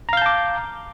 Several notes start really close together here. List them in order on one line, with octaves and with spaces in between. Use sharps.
A#5 F5 G6 A5 D6